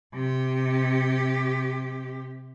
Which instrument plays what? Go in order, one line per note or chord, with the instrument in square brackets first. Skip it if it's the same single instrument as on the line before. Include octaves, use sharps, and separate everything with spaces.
[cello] C3 G4